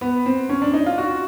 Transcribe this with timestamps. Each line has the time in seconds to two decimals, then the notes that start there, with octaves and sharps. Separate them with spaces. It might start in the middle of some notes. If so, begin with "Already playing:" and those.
0.01 B3
0.26 C4
0.49 C#4
0.62 D4
0.73 D#4
0.86 F4
0.98 F#4